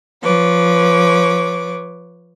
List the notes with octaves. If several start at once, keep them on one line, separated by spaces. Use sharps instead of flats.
F3 B4 C#5 D6